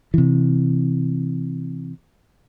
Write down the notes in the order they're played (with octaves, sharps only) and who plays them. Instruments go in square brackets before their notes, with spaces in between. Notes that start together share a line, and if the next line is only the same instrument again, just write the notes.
[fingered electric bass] C3 E3